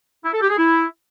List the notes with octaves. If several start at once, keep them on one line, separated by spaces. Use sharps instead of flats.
E4
A4
G4
G#4
E4